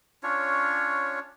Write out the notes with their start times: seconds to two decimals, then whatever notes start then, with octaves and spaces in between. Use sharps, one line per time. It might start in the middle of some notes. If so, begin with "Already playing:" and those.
0.23 C#4 D4 F4 C#5